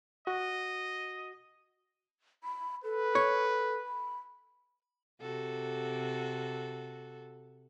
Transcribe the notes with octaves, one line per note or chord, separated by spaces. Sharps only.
F#4 D#5
B5
A4 B4
C#5
B5
C3 F#4 A4